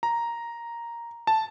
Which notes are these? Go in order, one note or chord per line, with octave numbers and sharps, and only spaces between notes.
A#5
A5